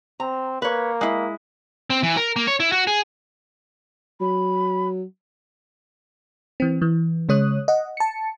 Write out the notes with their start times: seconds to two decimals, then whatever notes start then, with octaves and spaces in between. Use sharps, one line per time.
0.20 C4 A#5
0.62 A#3 B4 C#5
1.01 G#3 E4
1.90 C4
2.03 E3
2.17 A#4
2.36 A#3
2.47 C#5
2.60 E4
2.72 F#4
2.87 G#4
4.21 F#3 B5
6.60 E3 C4
6.82 E3
7.29 C#3 G#3 C#5 D#6 F#6
7.68 D#5 F#5
7.97 A5 C#7